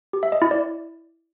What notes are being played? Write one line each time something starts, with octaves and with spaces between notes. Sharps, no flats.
G4
E5
D#5
E4
D5